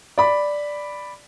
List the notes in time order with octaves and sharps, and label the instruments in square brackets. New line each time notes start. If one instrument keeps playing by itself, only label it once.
[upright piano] D5 B5